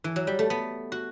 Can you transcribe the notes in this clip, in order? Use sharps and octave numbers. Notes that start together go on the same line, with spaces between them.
E3
F#3
G3
A3
B3
F#4